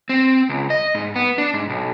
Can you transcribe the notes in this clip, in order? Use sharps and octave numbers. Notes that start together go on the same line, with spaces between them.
C4
C#2
D#5
G#2
B3
D4
G#2
B1